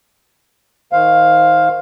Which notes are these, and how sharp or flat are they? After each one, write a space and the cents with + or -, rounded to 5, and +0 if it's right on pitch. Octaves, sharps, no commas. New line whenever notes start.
D#3 +25 C5 +0 F5 +10